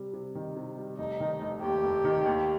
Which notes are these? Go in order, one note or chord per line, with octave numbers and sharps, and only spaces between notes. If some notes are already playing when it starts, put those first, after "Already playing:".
Already playing: C3 G3
C3
D#3
C3
G3
F1 D#4
D#3
F1
D#2 G4
F1
D#3
D#2